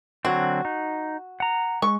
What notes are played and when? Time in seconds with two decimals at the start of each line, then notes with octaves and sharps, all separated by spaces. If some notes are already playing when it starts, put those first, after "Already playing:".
0.25 D3 F#3 C4 F#4
0.65 D#4
1.40 F#5 A#5
1.82 G#3 C#6